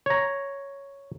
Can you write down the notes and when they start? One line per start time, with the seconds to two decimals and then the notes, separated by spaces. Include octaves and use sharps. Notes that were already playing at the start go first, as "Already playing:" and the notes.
0.06 C#5 A#5